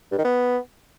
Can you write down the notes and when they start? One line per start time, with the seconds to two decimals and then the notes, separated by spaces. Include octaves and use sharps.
0.12 G2
0.18 D#3
0.25 B3